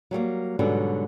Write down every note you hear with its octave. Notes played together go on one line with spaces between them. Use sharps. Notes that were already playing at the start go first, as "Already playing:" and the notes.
F#3 G3 A3 A#3
G#2 B2 D3 F#3 G3